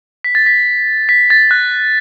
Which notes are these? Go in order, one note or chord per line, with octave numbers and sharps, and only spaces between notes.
B6
A6
B6
B6
A6
F#6